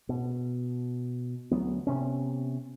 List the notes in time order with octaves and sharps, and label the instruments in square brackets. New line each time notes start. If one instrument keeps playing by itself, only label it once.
[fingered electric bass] B2
D2 F#3 B3
C3 B3 C#4